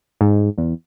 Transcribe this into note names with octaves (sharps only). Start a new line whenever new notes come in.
G#2
E2